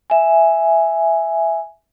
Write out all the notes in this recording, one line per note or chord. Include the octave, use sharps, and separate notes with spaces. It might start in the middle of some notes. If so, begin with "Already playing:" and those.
E5 G#5